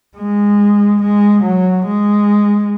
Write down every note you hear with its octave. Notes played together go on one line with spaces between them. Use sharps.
G#3
G#3
F#3
G#3